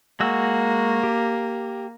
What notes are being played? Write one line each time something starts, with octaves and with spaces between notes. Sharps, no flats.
G#3 A#3 F#4 E6
G4